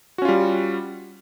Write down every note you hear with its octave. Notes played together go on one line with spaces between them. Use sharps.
G3 C#4 F4 F#4